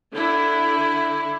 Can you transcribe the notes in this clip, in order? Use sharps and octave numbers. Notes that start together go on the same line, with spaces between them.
D3 E4